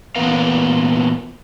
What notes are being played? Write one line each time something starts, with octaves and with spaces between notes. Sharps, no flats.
A#2 E3 B3 A#4 B4 F5